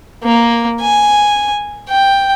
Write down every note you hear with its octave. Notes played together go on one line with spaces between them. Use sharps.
A#3
G#5
G5